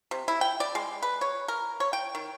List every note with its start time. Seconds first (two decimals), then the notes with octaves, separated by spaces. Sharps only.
0.11 C3
0.28 E4
0.41 G5
0.60 D5
0.75 G#3
1.02 B4
1.21 C#5
1.48 A#4
1.80 C#5
1.93 G5
2.15 D#3